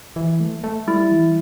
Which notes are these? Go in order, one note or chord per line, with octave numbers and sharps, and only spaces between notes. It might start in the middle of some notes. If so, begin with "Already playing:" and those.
E3
A3
A3
G3 E4
E3